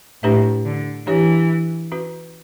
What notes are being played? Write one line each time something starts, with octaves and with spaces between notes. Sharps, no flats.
A2 D4 G4 B4 E5
D3
E3 D4 G4 C#5
C#4 F#4 B4